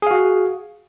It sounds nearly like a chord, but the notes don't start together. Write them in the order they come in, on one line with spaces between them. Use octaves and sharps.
G#4 F5 F#4